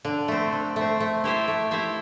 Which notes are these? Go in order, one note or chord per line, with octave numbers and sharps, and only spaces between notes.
D3
A3 C4
D3
A3 C4
A3
E4 G4 C5 E5
A3
E4 G4 C5 E5